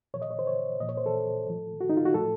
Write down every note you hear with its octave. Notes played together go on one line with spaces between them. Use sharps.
A#2 F3 C#5
D#5
C#5
C5
C#5
A#2 F3 D#5
C#5
C5
A4
A2 F3
F#4
D#4
F4
F#4
A2 F3 A4